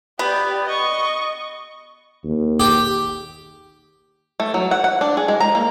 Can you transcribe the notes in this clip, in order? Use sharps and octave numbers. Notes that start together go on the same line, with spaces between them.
B3 G4 D5
D#5 C#6
D#2
G4
A3
F#3
F#5
F#5
D4
G#4
G#3
A#5
A#3